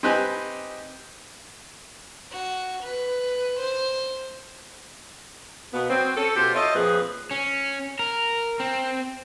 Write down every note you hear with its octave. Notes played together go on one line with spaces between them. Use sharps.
C4 D#4 G4 B4 G#5
F#4
B4
C5
B2 A#3 B3
F#3 C4
C#4 A4
B2 F4 G4 C5
F4 A4 C#5 D#5 E5
F2 A#2 F3 G#4 B4
C#4
A#4
C4